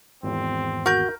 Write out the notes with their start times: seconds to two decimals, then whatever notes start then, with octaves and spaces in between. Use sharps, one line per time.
0.23 G#1 E2 C4
0.86 F#4 A#4 G6